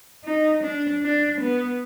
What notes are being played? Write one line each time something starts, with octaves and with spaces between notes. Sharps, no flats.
D#4
D4
D4
B3